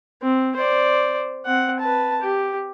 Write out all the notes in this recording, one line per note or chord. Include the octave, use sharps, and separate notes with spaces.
C4
C5 D5
C4 F#5
B4 A5
G4